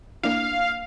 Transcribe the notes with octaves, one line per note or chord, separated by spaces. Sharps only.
A#3 D4 E4 F5